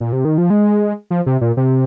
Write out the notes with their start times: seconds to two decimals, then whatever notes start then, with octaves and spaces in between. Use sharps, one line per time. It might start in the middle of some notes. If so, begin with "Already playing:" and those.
0.00 A#2
0.13 C3
0.25 D#3
0.38 F3
0.50 G#3
1.10 F3
1.26 C3
1.41 A#2
1.57 C3